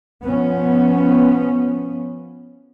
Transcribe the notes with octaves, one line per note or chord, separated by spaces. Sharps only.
F3 B3 C#4